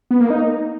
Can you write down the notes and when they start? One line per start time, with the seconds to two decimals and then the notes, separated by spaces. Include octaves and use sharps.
0.11 B3
0.20 A#3
0.30 D#4